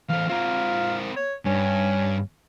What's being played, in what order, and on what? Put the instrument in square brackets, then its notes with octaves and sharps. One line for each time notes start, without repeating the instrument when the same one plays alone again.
[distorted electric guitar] E2 C5 [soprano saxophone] F5
[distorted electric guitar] C4 A#4 [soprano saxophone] F4
[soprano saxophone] C#5
[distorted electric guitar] G2 [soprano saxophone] C#4